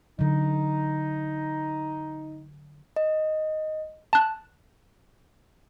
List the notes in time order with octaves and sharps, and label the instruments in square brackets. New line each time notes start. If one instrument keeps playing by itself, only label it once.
[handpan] D3 F#3 [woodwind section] D#4
[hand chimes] D#5
[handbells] A5 F#6